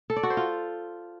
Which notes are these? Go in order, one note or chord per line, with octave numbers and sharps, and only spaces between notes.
A4
D5
F#4
C5
F4